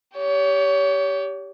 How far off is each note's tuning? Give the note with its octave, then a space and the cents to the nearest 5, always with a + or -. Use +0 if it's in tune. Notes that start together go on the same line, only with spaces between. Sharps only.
G4 +0 C#5 +30